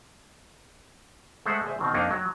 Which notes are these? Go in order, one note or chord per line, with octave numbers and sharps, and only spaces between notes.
G#3 A3 C5 E5 F#5
G#4 C5 D5 E5
B2 D#3 C4
F2 A#3 D4 D#4
F#3